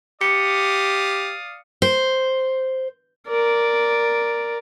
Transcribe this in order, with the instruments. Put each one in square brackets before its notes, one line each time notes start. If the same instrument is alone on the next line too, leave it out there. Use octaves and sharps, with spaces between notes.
[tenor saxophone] G4 [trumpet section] D5 F5 D#6 [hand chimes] C#7
[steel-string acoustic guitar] C5
[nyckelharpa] A#4 D5